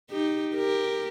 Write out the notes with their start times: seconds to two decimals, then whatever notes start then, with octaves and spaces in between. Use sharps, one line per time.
0.10 D#4 G4
0.55 G4 A#4